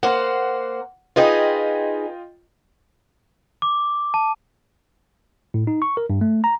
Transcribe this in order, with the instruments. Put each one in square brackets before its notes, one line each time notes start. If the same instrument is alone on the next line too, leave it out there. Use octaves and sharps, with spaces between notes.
[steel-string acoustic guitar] A#3 C5 [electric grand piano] F#5
[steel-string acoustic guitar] D#4 G#4 B4 [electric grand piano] F4 D#5 G5
[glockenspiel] D6
A5
[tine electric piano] A2
D#4
C#6
A#4
G2
A3
A#5